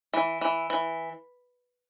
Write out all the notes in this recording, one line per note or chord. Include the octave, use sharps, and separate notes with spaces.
E3
E3
E3